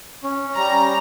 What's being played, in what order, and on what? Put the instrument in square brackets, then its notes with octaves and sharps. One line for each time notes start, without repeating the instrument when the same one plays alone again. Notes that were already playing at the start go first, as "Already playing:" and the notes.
[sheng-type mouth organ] C#4
[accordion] G3 [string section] A#5